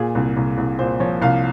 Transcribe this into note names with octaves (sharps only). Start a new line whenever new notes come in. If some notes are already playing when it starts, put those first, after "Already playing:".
Already playing: A#2 G#4
C2
C2
C2
A#2 C5
F3 C#5
C2 F5